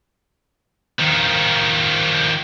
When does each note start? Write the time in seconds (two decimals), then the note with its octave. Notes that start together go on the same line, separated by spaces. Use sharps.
1.00 D#3 F3